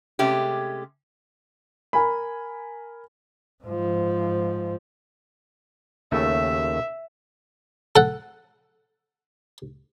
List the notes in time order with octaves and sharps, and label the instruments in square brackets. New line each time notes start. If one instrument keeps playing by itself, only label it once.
[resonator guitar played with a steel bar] C3 G#3 A3 C#4 G4
[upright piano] A#4 G#5 B5
[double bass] G#2 F3
[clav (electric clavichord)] D#2 C#3 A3 [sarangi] E5
[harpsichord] A4 F#5